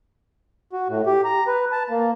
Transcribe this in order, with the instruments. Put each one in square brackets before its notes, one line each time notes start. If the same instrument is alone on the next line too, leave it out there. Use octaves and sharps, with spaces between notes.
[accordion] F#4
A2
G4
A#5
B4
A5
A#3